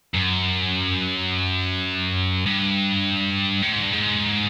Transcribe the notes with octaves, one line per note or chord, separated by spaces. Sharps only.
F#2
G2
A2
G#2
G2
G#2